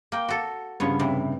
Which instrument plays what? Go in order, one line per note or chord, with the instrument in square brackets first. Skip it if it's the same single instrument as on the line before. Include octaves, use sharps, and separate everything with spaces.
[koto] A#3 G5
F#4 A4
[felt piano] G2 C#3 [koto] F3 B3 C#5
[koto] A2 C3 E3